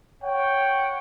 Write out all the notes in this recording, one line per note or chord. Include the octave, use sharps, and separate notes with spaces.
C#5 F#5 G5